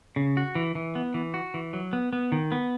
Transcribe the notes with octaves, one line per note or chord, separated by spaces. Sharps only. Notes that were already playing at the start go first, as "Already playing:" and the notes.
C#3
F#4
E3
E3
B3
E3
F#4
E3
F#3
B3
B3
D#3
B3